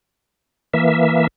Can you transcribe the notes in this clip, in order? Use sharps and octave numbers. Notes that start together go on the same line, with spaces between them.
E3 A#3 E5